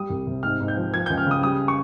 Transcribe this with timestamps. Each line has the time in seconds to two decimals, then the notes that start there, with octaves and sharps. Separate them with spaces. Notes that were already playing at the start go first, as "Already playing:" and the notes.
Already playing: G3 D#6
0.10 C2
0.27 C3
0.43 G#2 F6
0.60 G#2
0.68 G6
0.77 F3
0.93 F3 G#6
1.06 G6
1.10 C#2
1.18 F6
1.27 C#3 D#6
1.43 G3 D#6
1.68 C#6